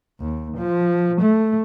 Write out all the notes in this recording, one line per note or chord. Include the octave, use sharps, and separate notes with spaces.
D#2
F3
A3